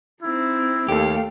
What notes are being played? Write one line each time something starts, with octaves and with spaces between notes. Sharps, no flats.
C4 D#4 E4
D#2 A3 G4 F5